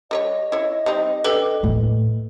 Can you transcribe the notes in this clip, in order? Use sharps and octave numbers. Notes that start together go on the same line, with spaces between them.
G3 B4 C#5 D#5
E4 C#5
G3 C4 D#4
D4 G4 A4 B4
D#2 A2